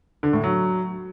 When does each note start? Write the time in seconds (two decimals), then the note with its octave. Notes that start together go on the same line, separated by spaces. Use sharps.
0.23 D3
0.33 A2
0.44 F#3